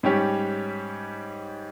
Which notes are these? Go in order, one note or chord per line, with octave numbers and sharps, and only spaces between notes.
G#2 G3 C#4 G4 C#5